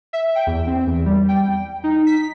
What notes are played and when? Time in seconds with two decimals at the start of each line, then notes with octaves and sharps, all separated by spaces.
0.13 E5
0.35 G5
0.47 E2
0.67 C4
0.87 E2
1.06 G3
1.29 G5
1.84 D#4
2.07 B6